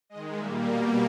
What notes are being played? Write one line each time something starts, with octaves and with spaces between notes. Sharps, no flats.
D#3 G#3 D#5
A#2 G3 A#3 E5
B2 G3 A#3 D#5